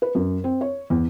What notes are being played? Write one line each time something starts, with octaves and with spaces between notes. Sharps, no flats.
B4
F#2
C4
C#5
E2